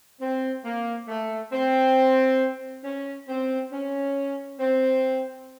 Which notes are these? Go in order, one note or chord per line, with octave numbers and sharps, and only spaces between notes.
C4
A#3
A3
C4
C#4
C4
C#4
C4